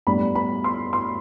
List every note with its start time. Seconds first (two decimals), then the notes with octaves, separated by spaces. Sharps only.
0.07 A2 G3 B3 D4 B5
0.35 B5
0.64 C6
0.93 C6